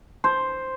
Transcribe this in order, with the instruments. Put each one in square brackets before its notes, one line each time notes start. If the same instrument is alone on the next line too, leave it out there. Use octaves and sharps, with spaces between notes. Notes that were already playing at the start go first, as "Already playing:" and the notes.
[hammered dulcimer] C5